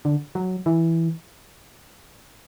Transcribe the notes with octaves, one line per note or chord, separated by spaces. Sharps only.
D3
F#3
E3